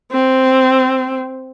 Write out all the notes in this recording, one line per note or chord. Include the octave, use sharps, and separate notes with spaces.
C4